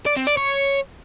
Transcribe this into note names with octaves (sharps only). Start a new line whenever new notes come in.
D5
C4
D5
C#5